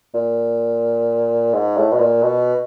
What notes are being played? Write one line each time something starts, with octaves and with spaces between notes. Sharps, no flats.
A#2
G#2
A2
B2
A#2
B2